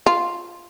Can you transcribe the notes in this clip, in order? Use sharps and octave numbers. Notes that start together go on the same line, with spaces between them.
F4